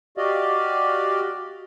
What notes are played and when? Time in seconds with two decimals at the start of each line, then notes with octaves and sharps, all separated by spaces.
0.18 F#4 G4 D5 D#5 F5